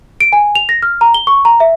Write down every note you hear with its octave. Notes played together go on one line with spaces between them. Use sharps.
D7
G#5
F7
A#6
F6
A#5
G7
C#6
A#5
E5